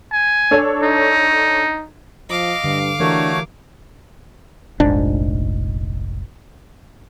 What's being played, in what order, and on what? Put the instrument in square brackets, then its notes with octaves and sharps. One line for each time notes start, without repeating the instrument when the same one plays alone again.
[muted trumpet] G#5
[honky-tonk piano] D4 A4 C#5
[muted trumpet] D#4
[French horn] F3 [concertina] D#5 [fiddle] F5 D6
[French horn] G2 [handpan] D3
[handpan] E3 G4 A#4 [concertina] A3 F#4 C#5 [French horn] D4
[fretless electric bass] F1 A#1 G#2 D4